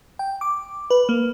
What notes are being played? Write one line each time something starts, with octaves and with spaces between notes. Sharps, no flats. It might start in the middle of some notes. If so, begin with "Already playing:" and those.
G5
D6
B4
A#3